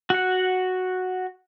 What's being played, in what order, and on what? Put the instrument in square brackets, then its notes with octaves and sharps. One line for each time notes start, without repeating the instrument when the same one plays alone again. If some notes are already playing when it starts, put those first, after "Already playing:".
[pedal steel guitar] F#4 F#5